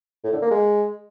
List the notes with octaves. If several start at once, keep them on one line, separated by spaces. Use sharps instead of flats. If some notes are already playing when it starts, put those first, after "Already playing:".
A2
D3
A#3
G#3